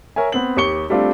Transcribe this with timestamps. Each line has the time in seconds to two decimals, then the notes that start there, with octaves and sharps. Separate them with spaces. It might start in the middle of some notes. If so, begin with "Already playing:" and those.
0.16 A#4 C#5 E5 G#5
0.32 B3 C4 F#7
0.56 D#2 G4 C#6 C#7 G7
0.90 G3 A3 C4 D4 F4